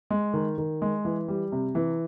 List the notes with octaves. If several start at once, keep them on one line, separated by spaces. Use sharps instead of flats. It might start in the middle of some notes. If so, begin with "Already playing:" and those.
G#3
D#3
D#3
G#3
E3
G3
C3
E3